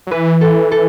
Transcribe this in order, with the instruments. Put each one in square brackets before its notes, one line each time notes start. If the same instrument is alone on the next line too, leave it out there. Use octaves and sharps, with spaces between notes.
[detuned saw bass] F#3
[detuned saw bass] E3 [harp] B4
[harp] A4
A4